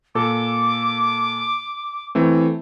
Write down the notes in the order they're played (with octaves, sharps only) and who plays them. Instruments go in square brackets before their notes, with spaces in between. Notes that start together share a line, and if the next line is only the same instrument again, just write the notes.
[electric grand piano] A#2 A4 [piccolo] D6
[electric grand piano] E3 A3 C4